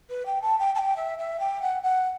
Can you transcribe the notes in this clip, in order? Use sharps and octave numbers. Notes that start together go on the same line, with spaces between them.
B4
G5
A5
G5
A5
G5
E5
E5
G5
F#5
F#5